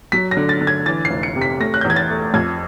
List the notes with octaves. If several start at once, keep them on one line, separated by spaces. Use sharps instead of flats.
F#3 B6
A#6
D3
A6
D3
G#6
E3 A6
C7
F1
C#7
C3
B6
A3 A#6
F#6
G6
E2
G#6
A6
A3
F2 G#6